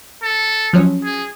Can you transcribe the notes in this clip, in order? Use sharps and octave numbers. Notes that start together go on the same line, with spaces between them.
A4
F3 F#3 C#4
G#4